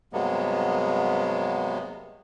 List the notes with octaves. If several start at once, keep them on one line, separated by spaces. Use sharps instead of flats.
G2 C3 F#3 G#3 A#3 B3